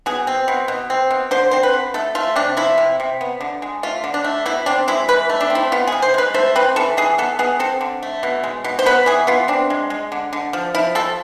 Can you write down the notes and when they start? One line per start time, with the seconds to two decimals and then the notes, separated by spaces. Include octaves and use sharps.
0.06 B2 G#4
0.27 C4
0.48 B2
0.68 B2
0.90 C4
1.10 B2
1.31 D3 C5
1.51 C4 C5
1.63 B4
1.73 D3
1.94 A3 A4
2.15 A3 F4
2.36 C3 D4
2.57 F3 E4
2.78 C3
3.00 C3
3.21 B3
3.41 D3
3.62 G#3
3.83 A3 F4
4.04 D3
4.14 D4
4.24 A3
4.46 B2 E4
4.66 C4 D4
4.88 G#3 E4
5.08 E3 B4
5.30 A3
5.41 D4
5.50 C4
5.55 E4
5.72 B3 F4
5.87 G#4
5.92 C3
6.02 C5
6.14 G#3 B4
6.34 A3 C5
6.55 C4 B4
6.76 E3 A4
6.97 E3 G#4
7.18 B3 A4
7.39 B3 G#4
7.59 C4 A4
7.81 D3
8.03 A3
8.23 B2
8.44 G#3
8.64 B2
8.79 C5
8.86 B3 B4
9.06 E3 G#4
9.27 B3 F4
9.48 C4 D4
9.70 G#3
9.90 G#3
10.12 D3
10.33 D3
10.53 F3
10.75 F3 E4
10.95 F3 A4